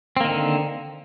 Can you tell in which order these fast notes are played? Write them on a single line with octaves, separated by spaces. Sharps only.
C4 A#3 D#3 D3